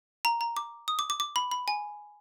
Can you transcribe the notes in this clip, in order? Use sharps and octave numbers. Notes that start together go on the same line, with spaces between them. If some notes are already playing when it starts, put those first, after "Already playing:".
A#5
A#5
D6
D#6
D6
D6
D6
B5
B5
G#5